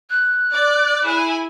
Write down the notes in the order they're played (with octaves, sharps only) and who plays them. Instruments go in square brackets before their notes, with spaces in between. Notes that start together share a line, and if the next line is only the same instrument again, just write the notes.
[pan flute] F#6
[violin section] D5
E4 G#4 G#5